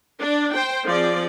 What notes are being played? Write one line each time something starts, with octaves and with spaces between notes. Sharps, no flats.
D4 D5
C5 G5
F3 C4 G#4 D5